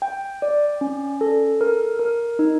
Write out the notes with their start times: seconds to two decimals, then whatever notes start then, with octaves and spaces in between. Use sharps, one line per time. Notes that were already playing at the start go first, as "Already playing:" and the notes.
0.02 G5
0.42 D5
0.81 C#4
1.21 A4
1.61 A#4
1.99 A#4
2.39 D#4